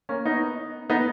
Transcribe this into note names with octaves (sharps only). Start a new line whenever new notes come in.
A#3 C#4
B3 D#4
B3 D#4